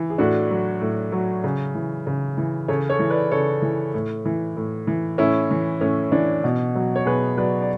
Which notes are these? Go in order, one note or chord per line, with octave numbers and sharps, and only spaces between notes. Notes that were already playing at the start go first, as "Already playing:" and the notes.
Already playing: E3
G#4
A2 D4 F#4
F#3
A2
F#3
C#3
E3
C#3
E3
C#3 A4 C#5
A4 C#5
E3
B4 D5
C#3 A4 C#5
E3
A2
E3
A2
E3
A2 C#4 E4
E3
A2 C#4
E3 D4
B2
F#3
C#5
B2 G#4 B4
F#3 B4 D5
D5